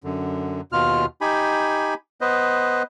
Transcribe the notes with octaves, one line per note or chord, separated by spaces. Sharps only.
F#2 D3
D#2 B2 F4 F6
D#4 G4 G#5 B5
B3 B4 C5 D#5